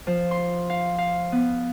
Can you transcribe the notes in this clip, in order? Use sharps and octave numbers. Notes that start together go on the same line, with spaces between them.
F3
C6
F5
F5
B3